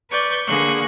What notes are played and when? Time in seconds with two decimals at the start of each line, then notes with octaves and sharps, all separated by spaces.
0.10 B4 D5 C#6 G6
0.46 D3 A#3 G#4 C#6 F#6